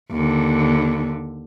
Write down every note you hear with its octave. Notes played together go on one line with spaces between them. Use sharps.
D#2 D3